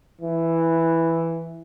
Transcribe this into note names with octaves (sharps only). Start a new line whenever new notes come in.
E3